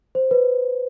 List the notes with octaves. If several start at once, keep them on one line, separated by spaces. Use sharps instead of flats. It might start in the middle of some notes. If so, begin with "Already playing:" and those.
C5
B4